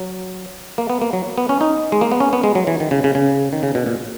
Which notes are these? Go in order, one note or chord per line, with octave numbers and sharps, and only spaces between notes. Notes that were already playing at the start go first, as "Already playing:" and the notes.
Already playing: F#3
A#3
B3
A#3
F#3
B3
C#4
D#4
G#3
A#3
B3
C#4
B3
G#3
F#3
E3
D#3
C#3
C#3
C#3
D#3
C#3
B2
A#2